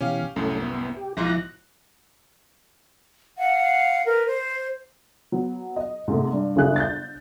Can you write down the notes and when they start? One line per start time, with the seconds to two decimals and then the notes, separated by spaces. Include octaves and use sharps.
0.01 B2 E3 C#4 G4 F5
0.36 C2 F#2 A2 A3 C#4 A4
0.62 B3
0.97 G4
1.17 B1 G#2 F3 E4 F4 A#6
1.29 F#6
3.37 F5 F#5
4.06 A#4 B4
4.25 C5
5.32 F#3 B3
5.76 D#5
6.08 G#2 C3 A3
6.33 G2
6.56 G1 C#3 F#3 G#4 E5 F#6
6.76 G6 A6